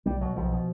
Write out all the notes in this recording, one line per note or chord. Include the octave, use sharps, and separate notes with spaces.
B1 G3
B2 F#3
B1 F3
B2